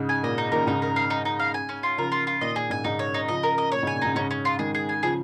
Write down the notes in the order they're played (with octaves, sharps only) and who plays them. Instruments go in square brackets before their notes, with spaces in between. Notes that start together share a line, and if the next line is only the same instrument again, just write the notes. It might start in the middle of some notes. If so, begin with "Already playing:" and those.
Already playing: [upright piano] G#2 C#3
[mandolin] G#5
[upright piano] A#2 [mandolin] D#5
[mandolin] D#4
[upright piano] A#2 D#3 [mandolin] A#4
[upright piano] G#2 C#3 [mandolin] D#4
[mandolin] A#4
F5
D#4
D#4
F5
G#5
C#4
F4
[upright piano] C#3 F3 [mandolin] A#4
[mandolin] F4
F4
[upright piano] A#2 D#3 [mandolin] D#5
[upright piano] A#2 [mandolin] G#4
[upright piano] G#2 [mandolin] G#5
[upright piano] G#2 C#3 [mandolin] D#4
[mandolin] C#5
D#4
[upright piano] C#3 F3 [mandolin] D#5
[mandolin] A#4
D#5
[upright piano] A#2 [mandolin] C#5
[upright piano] G#2 C#3
[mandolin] G#5
[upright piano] A#2
[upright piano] G#2 C#3 [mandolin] D#4
[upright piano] G#2 C#3 [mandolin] C#4
[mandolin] C#4
F4
[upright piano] D#3 G#3 [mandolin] G#4
[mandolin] G#4
G#5
[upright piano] C#3 F3 [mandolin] G#4